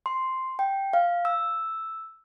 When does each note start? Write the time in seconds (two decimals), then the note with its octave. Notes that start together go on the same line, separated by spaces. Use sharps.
0.06 C6
0.59 G5
0.93 F5
1.25 E6